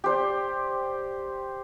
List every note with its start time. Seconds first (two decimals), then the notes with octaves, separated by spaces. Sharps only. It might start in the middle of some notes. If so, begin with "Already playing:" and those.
0.04 G4 C5 D5